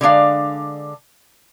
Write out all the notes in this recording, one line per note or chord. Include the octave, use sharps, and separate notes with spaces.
D3 G#3 D4 F5